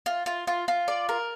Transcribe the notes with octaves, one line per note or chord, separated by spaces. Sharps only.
F4
F4
F4
F4
D5
A#4